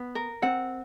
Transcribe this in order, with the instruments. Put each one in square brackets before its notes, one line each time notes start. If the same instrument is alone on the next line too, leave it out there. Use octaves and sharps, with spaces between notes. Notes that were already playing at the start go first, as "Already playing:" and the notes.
Already playing: [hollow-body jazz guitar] B3
[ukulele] A#4
[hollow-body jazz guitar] C4 [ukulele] F#5